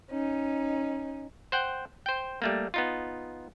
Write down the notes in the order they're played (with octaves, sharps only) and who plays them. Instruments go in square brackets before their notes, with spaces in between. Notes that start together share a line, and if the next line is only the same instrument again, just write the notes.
[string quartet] C#4 D#4
[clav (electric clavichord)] C5 F#5 G5
C5 G5
G3 A3 A#3
B3 D#4 F4